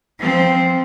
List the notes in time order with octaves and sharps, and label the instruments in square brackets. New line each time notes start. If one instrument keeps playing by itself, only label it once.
[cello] F3 C4